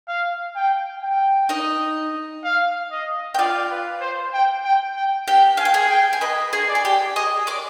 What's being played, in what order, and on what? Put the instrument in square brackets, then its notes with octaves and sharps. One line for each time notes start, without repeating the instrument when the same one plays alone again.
[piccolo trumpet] F5
G5
G5
[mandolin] D#4 D#5
[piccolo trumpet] F5
D#5
[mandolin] G5
[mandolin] F4 F5 [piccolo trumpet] D5
[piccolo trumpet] B4
C5
G5
G5
G5
[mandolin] G4 G5
[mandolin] F5 [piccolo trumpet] G#5
[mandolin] G5
G#4 G#5
[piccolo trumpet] G5
[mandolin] G#5
[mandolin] B4 B5 [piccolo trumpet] D#5
[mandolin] G#4 G#5
[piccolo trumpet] D5
[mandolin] G#5
G4 G5
[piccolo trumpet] G#4 [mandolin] D#5 D#6
[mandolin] D5 D6